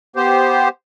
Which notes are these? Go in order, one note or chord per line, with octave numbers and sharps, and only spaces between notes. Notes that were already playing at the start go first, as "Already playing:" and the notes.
B3 G4 C5